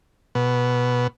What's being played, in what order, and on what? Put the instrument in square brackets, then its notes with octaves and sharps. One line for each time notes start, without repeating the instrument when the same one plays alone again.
[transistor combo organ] B2